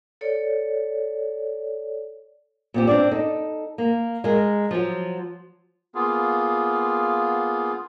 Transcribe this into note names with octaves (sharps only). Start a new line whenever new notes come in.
A4 C#5 D5
A#2 C4 G4
C4 D4 D5
D#4 A4
A#3
G#3 A#4
F3 F#3
A#3 B3 F4 G#4